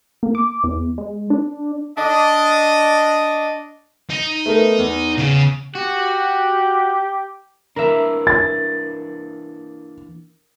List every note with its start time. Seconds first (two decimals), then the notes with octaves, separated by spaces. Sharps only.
0.23 A#3
0.35 D6
0.64 E2
0.98 G#3
1.30 D4
1.98 D4 D#5
4.10 D#4
4.46 A3 B3 A#4
4.78 E2
5.18 C#3
5.75 F#4 G4
7.76 E3 A#3 D4 A#4 E5
8.27 A6